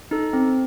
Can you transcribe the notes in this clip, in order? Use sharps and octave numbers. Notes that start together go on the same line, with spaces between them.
D#4 A4
C4